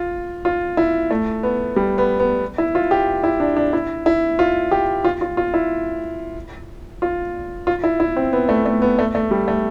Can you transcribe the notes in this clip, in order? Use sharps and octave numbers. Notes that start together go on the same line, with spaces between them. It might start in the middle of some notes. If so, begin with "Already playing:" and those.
Already playing: F4
F4
E4
A3
B3
G3
B3
B3
E4
F4
G4
E4
D4
D4
E4
E4
F4
G4
F4
F4
F4
E4
F4
F4
E4
E4
C4
B3
A3
A3
B3
A3
A3
G3
A3